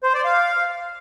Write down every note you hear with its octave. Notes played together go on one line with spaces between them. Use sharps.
C5
D5
F5